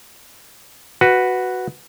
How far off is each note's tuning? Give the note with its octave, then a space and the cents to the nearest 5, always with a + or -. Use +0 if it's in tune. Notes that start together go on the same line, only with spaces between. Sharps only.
F#4 +0 B4 +0